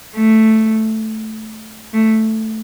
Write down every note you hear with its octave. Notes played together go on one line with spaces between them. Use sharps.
A3
A3